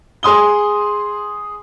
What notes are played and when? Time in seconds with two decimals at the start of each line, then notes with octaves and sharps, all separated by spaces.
0.23 G#4 C6 D#6 G7